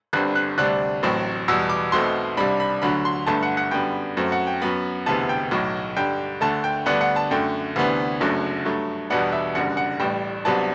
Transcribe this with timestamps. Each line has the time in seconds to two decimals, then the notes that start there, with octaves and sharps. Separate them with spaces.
0.13 G1 G2 D3 G3 C4 F#6
0.35 F#6
0.58 D2 C3 G3 D4 F#6
1.03 A1 A2 F#3 C4
1.48 E2 B2 G3 E6
1.69 D6
1.92 B1 B2 A3 C4 C6
2.37 C2 C3 G3 D4 B5
2.60 B5
2.82 D2 D3 F#3 B5
3.05 C6
3.27 G1 G2 D3 A3 A5
3.43 F#5
3.57 F#5
3.71 F#2 D3 G3 B3 G5
4.17 F#2 F#3 A3 C4
4.32 F#5
4.47 G5
4.62 F#2 F#3 B3 B5
5.06 E1 D2 C3 E3 B3 A5
5.29 G5
5.51 B1 A2 F#3
5.96 G2 D3 G3 G5
6.41 D2 D3 A3 A5
6.64 G5
6.86 D2 D3 G3 B3 D4 F#5
7.01 F#5
7.16 A5
7.31 F#2 D3 A3 G5
7.76 D2 C3 E3 B3 D4
8.20 F#1 F#2 D3 F#3 A3
8.65 G2 F#3 A3
9.10 E2 B2 G3 B3 D4 F#5
9.32 E5
9.55 F#1 F#2 D3 G3 F#5
9.77 F#5
10.00 A1 A2 G3 G5
10.45 C2 C3 F#3 B3 D4 A5